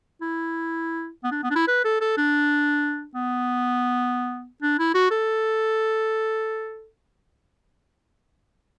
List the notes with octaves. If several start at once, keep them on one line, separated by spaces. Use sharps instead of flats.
E4
B3
D4
B3
D4
E4
B4
A4
A4
D4
B3
D4
E4
F#4
A4